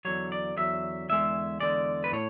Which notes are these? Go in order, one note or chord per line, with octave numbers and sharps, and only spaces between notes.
E2 D3 F#3 C#5
D5
E2 D3 F#3 E5
E2 D3 G#3 E5
E2 D3 G#3 D5
B4
A2 C#5